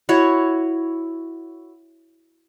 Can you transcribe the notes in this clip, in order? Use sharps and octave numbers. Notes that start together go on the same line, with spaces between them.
E4 F#4 C#5